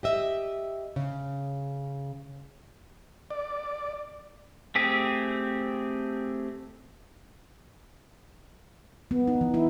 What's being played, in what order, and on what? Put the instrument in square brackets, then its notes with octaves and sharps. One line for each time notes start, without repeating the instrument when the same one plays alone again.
[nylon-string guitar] G4 D#5 E5
C#3
[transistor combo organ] D5
[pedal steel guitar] A3 C4 G4 G#4
[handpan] B3
D#4
E3
E4